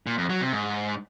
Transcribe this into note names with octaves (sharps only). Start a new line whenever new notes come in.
A#2
F2
F#3
C3
G#2